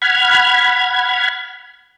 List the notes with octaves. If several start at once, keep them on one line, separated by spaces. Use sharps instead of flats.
F#5 B5 F6 G#6